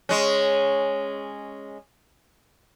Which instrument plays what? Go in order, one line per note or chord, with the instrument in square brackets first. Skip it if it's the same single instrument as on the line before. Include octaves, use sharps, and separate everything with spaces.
[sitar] G#3 C#4